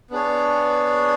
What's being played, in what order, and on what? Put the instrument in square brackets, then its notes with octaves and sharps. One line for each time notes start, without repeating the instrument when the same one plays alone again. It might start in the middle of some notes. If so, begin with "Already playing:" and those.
[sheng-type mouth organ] B3 D4 G#4 C#5